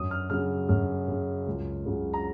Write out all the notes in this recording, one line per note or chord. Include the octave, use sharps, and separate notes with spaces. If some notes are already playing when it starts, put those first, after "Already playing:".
Already playing: F#2 D#6
F6
C#3 F#3 F6
F#2 F6
C#3 F#3
C#2
C#3 F#3
A#5